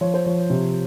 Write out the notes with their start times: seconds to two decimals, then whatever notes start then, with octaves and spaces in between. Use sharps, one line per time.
0.01 F3 C#5
0.14 C5
0.26 F3 C#5
0.50 C3